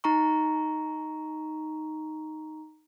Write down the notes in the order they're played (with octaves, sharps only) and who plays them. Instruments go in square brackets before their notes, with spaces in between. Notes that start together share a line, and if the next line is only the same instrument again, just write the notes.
[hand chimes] D#4 A#5 C#6